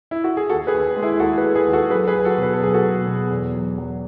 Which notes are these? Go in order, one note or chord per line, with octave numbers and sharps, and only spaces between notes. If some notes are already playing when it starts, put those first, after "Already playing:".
E4
F#4
G#4
D#2 F#4 A4
G#4 B4
D#2
G#3
E4 G#4
D#2 F#4 A4
G#4 B4
G#3
G#4 B4
D#2
F#4 A4
F#3 G#4 B4
G#4 B4
F#3
F#4 A4
B2
B4
A4
F#3 G#4
F#4 A4
B2
B2
E2
F#3
F#3